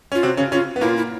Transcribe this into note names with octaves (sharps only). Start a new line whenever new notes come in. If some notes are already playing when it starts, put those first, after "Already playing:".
C#4 F4
C3 C4 F#4
C#3 C#4
C#3 C#4 F4
B3
A#2 A#3 E4
F4
E4